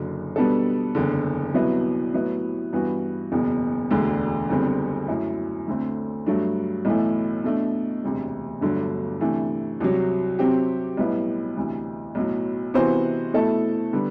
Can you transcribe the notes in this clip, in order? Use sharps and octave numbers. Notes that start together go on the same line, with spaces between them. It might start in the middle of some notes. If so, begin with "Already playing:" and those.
Already playing: F#1 F#2 D3
B2 G3 B3 D4 A4
F#1 E2 D3
C2 B2 F#3 B3 E4
A2 F#3 B3 E4
G2 E3 B3 F#4
F#1 E2 B2
E1 D2 D3
F#1 E2 D3 G3 C4
F#2 F#3 A3 E4
D2 D3 A3 C4
G2 F#3 A3 D4
B1 A2 E3 A3
B2 A3 D4
E1 D2 C3
G1 G2 D3 F#3 A3
C3 E3 A3 D4
C2 C3 F#3
C3 F#3 C4 G4
B1 A2 G3 B3 E4
D2 C3 E3
B1 A2 F#3
C3 E3 B3 F#4 C5
B2 A3 E4 A4
D3 G3 B3 D4